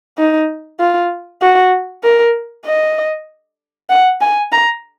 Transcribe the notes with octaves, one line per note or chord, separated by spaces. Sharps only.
D#4
F4
F#4
A#4
D#5
F#5
G#5
A#5